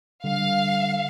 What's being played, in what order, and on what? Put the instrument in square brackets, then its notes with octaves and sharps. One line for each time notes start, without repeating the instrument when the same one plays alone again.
[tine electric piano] D3 G3 [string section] F5